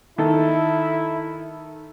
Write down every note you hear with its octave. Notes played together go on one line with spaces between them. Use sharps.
D#3 E4 A4